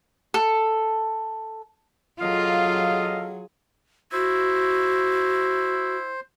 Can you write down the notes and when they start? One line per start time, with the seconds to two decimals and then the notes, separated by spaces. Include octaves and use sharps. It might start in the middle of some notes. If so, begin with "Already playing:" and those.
0.34 A4
2.21 F#3 F4 G#4 A4 D#5 F5
4.12 E4 F#4 C5